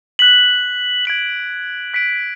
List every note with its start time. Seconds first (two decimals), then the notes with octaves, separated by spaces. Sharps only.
0.19 F#6 B6 F#7
1.05 G#6 D7 F#7
1.94 F#6 B6 D7